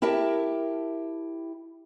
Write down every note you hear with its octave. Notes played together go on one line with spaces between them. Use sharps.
E4 G4 A#4 E5 A5